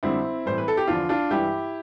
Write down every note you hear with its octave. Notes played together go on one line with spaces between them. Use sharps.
F2 D3 G3 C4 E4
A2 E3 G3 C5
B4
A4
G4
E2 D3 F3 D4 F4
D4 F4
G2 E3 G3 E4 G4